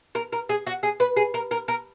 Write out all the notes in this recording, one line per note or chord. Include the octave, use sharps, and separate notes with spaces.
A#4
A#4
G#4
F#4
G#4
B4
G#4
A#4
A#4
A#4